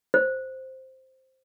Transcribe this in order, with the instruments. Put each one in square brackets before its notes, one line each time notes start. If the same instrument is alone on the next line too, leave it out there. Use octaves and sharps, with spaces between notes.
[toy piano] C5